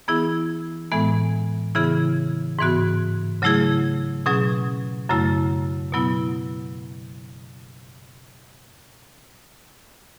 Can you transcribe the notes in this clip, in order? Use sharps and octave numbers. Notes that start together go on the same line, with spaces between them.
E3 B3 E4 G#4
A2 E3 G#3 B3
C#3 E3 B3 E4 G#4
G#2 E3 B3 F#4
C#3 F#3 A3 E4 G#4
B2 F#3 C#4 G#4
F#2 C#3 F#3 A3 E4
B2 F#3 B3 E4